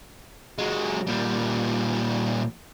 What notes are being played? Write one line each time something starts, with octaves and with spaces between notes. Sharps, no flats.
F#3 G#3
A#2 G3